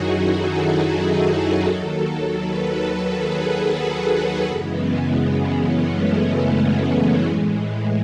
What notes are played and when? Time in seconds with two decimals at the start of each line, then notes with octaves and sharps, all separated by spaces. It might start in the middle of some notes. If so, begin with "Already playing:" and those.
Already playing: F#2 D#3 F#3 D#4 E4 F#4 G#4
0.25 A4
1.65 D#2 D#3 F#3
2.35 B4
2.70 A4
3.05 G#4
3.39 F#4
3.75 F#4
4.44 F#2 C#3 E3 G#3 B3
5.15 B3
5.49 C#4
5.84 A3
6.19 B3
7.23 A2 E3 G#3